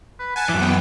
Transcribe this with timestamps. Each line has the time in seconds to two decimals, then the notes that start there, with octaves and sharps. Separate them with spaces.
0.19 B4
0.36 F#5 G#5 A5
0.49 F#2 E3 D6
0.61 B3 G5